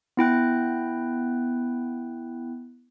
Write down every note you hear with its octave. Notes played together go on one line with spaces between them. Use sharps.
B3 E4 G5 F#6